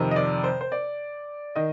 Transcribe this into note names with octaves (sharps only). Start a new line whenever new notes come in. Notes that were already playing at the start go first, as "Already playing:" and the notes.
Already playing: F2 C3 D#3
D#5
D5
C5
C5
D5
D#3 D#5